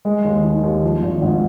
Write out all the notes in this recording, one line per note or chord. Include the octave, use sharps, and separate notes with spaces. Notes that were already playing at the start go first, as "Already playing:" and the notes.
G#3
D#2
D#3
D#2
F3
G#1
G#2